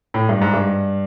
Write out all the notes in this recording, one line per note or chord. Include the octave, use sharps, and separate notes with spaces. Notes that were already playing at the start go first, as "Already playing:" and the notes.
A2
G2
G#2
G2